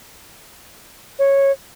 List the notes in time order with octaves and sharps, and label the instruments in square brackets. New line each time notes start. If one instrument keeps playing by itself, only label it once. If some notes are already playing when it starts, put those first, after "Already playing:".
[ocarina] C#5